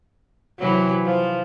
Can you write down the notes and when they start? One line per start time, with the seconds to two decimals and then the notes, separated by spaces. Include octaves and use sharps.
0.59 C3 E3 F#3
1.05 F3